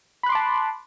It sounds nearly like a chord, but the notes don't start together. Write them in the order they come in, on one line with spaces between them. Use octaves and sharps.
B5 F#6 C6 D6 A5